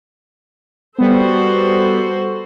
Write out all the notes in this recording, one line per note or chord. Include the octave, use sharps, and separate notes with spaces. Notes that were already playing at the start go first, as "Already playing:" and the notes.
G3 B3 F#4 A4 C5